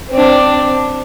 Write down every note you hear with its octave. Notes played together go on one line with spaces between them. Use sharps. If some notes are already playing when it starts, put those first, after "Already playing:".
C4 D4